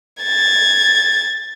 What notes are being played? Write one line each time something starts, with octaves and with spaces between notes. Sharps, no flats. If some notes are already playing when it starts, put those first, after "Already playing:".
G#6 A6